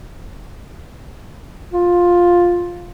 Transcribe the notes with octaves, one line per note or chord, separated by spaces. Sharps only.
F4